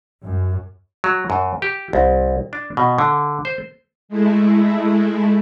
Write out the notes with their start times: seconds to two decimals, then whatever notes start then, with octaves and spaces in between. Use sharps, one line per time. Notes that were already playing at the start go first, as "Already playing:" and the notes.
0.22 F#2
1.04 F#3
1.30 F#2
1.62 G4
1.93 C2
2.53 D4
2.77 B2
2.98 D3
3.45 C5
4.09 G#3 A3 E4